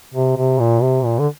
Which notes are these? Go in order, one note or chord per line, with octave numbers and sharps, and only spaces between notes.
C3
C3
A#2
C3
A#2
D3